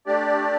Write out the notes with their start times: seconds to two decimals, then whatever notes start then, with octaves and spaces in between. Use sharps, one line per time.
0.06 A3 D4 G4 D5